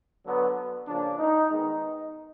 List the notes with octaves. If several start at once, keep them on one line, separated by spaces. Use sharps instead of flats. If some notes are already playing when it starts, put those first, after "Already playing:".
D3 F#3 B3
C#3 F3 A#3 D4
D#4
D#3 G#3 B3 D#4